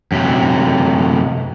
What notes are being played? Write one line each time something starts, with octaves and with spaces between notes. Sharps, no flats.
F#2 C3